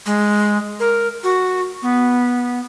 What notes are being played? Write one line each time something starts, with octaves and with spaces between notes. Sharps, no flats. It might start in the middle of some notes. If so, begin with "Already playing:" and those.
G#3
A#4
F#4
B3